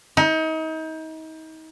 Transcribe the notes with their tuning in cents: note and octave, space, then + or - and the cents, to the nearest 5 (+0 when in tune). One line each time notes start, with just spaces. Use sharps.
D#4 +35